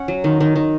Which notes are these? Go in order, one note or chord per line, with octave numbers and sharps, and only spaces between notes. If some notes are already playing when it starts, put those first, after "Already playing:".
Already playing: C#4 C#5 F#5
F#3
D#3
D#3
D#3